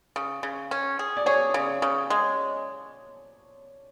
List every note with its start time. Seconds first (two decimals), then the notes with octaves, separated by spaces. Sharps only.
0.16 C#3
0.43 C#3
0.71 C#4
0.99 G#4
1.17 D5
1.26 G#4 C#5
1.54 C#3
1.82 C#3
2.10 G#3